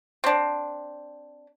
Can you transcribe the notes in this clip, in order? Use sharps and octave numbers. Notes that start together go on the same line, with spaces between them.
C4 D4